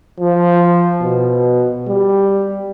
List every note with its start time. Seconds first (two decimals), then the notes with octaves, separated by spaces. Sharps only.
0.20 F3
1.01 B2
1.87 G3